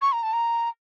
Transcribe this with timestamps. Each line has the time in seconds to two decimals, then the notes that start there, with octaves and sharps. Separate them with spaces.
0.02 C#6
0.12 A#5
0.23 A5
0.33 A#5